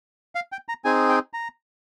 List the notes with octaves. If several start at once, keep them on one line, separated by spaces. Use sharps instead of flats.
F5
G5
A#5
C4 D#4 G#4 G#5
G5
A#5